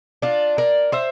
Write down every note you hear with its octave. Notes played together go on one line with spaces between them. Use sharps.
D4 F4
A#4 D5
C5 E5